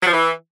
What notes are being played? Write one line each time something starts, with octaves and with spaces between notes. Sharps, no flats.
F#3
F3
E3